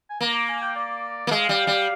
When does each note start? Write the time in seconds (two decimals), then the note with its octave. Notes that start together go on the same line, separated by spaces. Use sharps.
0.10 G#5
0.21 A#3 A#5
0.34 A#5
0.48 G#5
0.62 G5
0.76 D5
1.27 A#3
1.31 G#3 F5
1.49 G3
1.67 G3